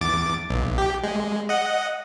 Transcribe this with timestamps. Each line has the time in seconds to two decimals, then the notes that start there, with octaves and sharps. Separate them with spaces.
0.01 E2 D6 A6
0.50 B1
0.78 G4
1.04 G#3
1.49 D#5 F#5